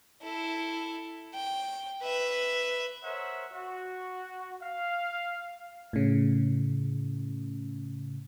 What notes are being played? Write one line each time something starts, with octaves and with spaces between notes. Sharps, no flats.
E4 A4
G5
B4 E5
A#4 C5 C#5 E5 F#5
F#4
F5
A2 C#3